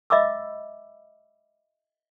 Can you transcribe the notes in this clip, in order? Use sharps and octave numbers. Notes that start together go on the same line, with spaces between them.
D#5 E5 B5 D6 E6